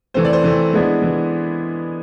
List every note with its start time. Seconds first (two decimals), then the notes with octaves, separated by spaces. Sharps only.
0.14 E3 A3 C4 C5
0.25 D5
0.33 C5
0.44 E3 A3 C4
0.73 E3 G#3 B3 D4
1.02 E3